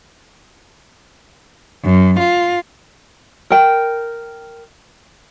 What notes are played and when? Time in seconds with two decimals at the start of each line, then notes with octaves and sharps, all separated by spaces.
1.84 F#2
2.19 F4
3.50 A#4 G5